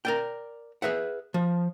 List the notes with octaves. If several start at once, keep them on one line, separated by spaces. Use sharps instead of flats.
A#4 D5 G5
G#4 B4 E5 F#5
F3